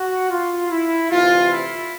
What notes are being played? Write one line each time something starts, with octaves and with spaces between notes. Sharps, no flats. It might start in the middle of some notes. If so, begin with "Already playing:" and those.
Already playing: F#4
F4
E4
D2 C3 E3 F4
E4